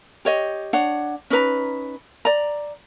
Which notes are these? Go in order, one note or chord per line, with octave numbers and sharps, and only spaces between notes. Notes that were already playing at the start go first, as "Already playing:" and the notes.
G4 C#5 D#5
D4 C#5 F#5
C#4 D#4 B4 A#5
D5 A#5